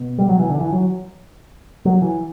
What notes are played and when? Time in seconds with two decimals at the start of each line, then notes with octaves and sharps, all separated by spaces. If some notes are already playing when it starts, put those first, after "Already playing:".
Already playing: B2
0.18 G3
0.29 F#3
0.39 E3
0.50 D3
0.61 E3
0.72 F#3
1.85 F#3
2.02 E3